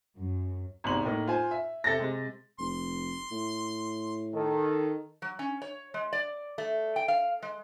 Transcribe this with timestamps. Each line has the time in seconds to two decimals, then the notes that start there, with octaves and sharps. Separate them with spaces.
0.17 F#2
0.84 G#1 E2 G#2 C3 F#7
1.05 A2 A#3 D#4
1.28 F4 C5 G#5
1.51 E5
1.84 C3 A4 E5 A6 A#6
1.99 C3 G#3
2.59 F1 C6
3.31 A2
4.34 D#3 A4
5.22 F#3
5.39 C#4
5.62 C#5
5.94 G#3
6.13 D5
6.58 A3
6.96 G5
7.08 F5
7.42 G#3